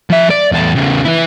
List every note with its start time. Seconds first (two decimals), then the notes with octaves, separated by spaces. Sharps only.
0.10 F3 E5
0.30 D5
0.52 E2 A4
0.75 E2 C#3
1.05 E3 E4